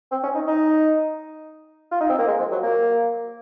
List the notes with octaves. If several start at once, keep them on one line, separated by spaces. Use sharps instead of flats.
C4
C#4
D#4
D#4
F4
D#4
C4
A#3
G#3
F3
F#3
A#3